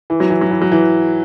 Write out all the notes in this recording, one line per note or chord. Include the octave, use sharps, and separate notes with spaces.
E3
F#3
E3
F#3
E3
F#3
E3